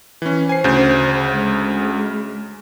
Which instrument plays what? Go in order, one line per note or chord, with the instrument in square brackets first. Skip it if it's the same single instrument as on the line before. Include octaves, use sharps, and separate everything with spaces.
[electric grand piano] E3 C#4
[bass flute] C5 [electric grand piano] G#5 C7
[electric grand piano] D2 C#3 G6
[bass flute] G#3